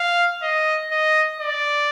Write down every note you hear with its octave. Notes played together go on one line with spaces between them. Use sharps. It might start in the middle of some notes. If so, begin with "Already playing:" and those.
Already playing: F5
D#5
D#5
D5